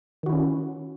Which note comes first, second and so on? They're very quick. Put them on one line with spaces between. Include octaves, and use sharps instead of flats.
D#3 F#4 E4 C#4